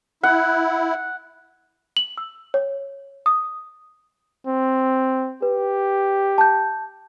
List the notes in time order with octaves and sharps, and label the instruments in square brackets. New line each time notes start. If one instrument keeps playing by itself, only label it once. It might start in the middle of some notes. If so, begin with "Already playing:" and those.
[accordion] E4 [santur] F#5
[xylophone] F#7
E6
C#5
D#6
[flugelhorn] C4
[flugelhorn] G4 [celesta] B4
[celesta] A5 G6